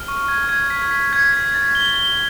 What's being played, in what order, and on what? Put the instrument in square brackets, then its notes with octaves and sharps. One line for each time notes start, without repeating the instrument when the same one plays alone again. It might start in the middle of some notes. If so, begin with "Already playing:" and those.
Already playing: [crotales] F6
C#6
G#6
G#6
B6
B6
G#6
B6
A6
G7
G7